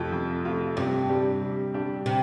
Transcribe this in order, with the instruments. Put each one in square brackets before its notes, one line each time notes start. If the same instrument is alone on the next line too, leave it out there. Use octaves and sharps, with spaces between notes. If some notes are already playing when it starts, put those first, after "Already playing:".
Already playing: [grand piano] F2 C3 A3 F4
F2
C3 A3 F4
[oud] G2 [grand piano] C3
[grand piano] G3 D4 G4
C3
G3 D4 G4
[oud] C3